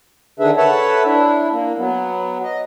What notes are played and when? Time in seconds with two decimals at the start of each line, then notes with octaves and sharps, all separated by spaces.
0.40 D3 D#3 D4 G#4 B4 E5
0.57 A4 B4 C#5 E5 F#5 A5
1.05 D4 E4
1.52 A#3
1.78 F#3 B3
2.43 D#5